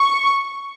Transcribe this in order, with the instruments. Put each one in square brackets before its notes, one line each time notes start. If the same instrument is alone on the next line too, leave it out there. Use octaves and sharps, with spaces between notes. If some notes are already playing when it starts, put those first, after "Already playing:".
Already playing: [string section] C#6